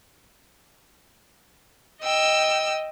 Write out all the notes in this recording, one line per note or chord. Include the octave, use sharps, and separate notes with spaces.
D#5 G5 E6